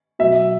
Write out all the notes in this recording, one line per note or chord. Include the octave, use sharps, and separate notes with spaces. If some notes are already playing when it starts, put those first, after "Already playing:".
B2 F#3 E5